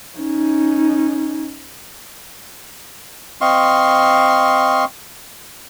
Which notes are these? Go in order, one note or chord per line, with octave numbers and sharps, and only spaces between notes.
C#4 D#4
C4 D#5 F5 C6 C#6